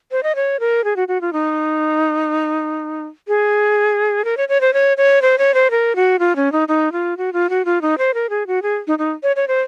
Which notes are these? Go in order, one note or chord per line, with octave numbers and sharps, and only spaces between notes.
C5
D#5
C#5
A#4
G#4
F#4
F#4
F4
D#4
G#4
A#4
C#5
C#5
C5
C#5
C#5
C5
C#5
C5
A#4
F#4
F4
C#4
D#4
D#4
F4
F#4
F4
F#4
F4
D#4
C5
A#4
G#4
F#4
G#4
D#4
D#4
C#5
C#5
C5